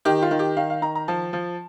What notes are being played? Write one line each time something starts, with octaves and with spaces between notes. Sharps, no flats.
D#3 G4
F4
D#3
G4
D#3 F5
F5
D#3 A#5
A#5
F3 A5
F3